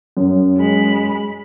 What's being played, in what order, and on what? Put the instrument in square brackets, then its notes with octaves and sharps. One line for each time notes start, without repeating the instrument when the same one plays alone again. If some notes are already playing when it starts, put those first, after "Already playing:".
[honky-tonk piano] F#2
[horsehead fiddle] G#3 B5